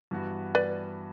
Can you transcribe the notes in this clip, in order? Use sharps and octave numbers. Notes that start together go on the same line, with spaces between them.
G2 E3 B3 F#4
B4 D5